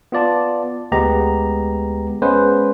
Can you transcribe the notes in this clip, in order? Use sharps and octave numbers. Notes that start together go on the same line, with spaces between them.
B3 F4 D5 A5
D2 G#3 B3 G4 A#5
G#3 B3 C#4 B4 C5